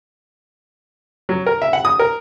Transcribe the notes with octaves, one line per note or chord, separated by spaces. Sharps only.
F#3
A#4
E5
F#5
D#6
A#4